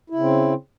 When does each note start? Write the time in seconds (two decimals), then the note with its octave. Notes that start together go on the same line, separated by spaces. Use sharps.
0.10 E4
0.15 C#3
0.20 C4